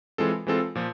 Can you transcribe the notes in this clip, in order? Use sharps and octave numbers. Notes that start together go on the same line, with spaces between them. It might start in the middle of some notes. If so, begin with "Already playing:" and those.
E3 G#3 C4 F4 A4
E3 G#3 C4 F4 A4
A#2 F3